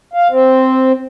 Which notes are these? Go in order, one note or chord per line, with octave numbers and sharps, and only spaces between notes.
F5
C4